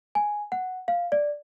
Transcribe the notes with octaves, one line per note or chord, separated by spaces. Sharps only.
G#5
F#5
F5
D5